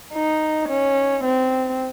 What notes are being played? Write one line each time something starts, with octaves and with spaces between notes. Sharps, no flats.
D#4
C#4
C4